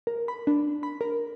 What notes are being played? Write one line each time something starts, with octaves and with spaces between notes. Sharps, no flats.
A#4
B5
D4
B5
A#4